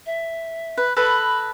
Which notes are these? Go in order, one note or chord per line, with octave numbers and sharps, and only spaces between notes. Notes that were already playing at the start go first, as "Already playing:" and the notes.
E5
B4
A4 B4 D#5 B5